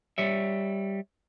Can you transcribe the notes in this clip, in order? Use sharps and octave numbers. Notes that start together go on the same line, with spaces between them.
G3 C#5 E5